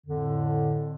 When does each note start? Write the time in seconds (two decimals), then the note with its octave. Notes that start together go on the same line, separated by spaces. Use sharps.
0.06 F2 A2 D3